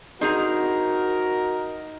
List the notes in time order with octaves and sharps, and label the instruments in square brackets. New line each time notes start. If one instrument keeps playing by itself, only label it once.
[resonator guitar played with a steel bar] C4 G#4 A#5 [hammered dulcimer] D#4 [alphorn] F#4 [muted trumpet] A#4